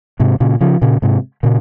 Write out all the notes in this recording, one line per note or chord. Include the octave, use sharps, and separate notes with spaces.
G#2 C3
A#2 C#3
C#3 F3
A#2 C#3
G#2 C3
A#2 C#3